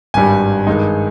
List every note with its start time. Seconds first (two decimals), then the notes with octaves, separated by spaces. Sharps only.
0.14 G#1 G2 G3 G#5
0.67 G2 D#3 G#3 D#4